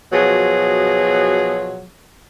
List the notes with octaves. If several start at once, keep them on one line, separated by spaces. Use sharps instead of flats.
B2 F3 F#3 G#4